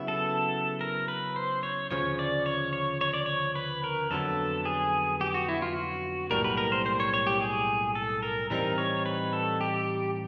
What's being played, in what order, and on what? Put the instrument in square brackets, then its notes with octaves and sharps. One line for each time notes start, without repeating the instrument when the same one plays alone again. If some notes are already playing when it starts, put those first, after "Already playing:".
Already playing: [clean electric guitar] C#3 F#3 B3 E4
[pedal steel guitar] A4
A#4
B4
C5
C#5
[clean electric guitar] D2 C#3 F3 [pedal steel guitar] C#5
[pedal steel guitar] D5
C#5
C#5
C#5
D5
C#5
B4
A#4
[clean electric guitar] F2 D3 F#3 B3 [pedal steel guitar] A4
[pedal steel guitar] G#4
G4
F#4
E4
F4
F#4
[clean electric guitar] B1 A2 E3 G3 A#3 [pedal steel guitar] A#4
[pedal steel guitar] B4
A#4
C5
C5
C#5
C#5
G4
G#4
A4
A#4
[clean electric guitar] A2 E3 G3 C4 D#4 [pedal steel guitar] A#4
[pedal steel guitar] C#5
B4
A4
G4